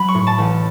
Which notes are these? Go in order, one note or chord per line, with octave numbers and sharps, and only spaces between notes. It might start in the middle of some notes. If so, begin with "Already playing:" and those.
Already playing: F#3 B5
C#6
A2
A5
A1